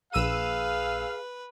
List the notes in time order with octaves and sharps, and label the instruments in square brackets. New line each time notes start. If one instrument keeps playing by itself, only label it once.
[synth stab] A#1 E6 D#7 [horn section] G#4 F5 [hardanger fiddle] B4